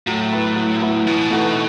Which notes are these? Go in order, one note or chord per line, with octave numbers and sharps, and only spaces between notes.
A2 F#3
B3 E4 B4
F#3
B3 E4 B4
B2 E3
A3 D#4 F#4 B4